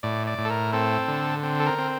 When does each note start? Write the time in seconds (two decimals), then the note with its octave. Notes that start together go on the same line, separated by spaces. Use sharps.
0.03 A2 D5
0.27 D5
0.38 A2
0.45 A4
0.50 A#4
0.73 C4 A4
1.08 D3
1.43 C4
1.60 A4
1.67 A#4
1.78 C4